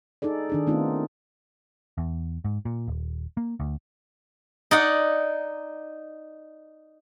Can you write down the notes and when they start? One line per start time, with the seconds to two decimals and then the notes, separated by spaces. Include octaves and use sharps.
0.22 D#4 G#4 A4 D5
0.50 D#3 D4 G#4
0.67 D#3 A3 B3 C4 D#4 F4
1.98 E2
2.45 G#2
2.65 A#2
2.88 D#1
3.37 A#3
3.60 D2
4.71 D#4 D5 F#5